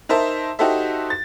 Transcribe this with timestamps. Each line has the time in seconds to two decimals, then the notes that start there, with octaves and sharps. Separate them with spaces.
0.09 D#4 A#4 C5 E5 A5
0.59 D#4 F#4 G4 A4 C5 E5
1.10 A6